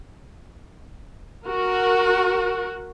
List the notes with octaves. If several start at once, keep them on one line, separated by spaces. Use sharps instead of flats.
F#4 A#4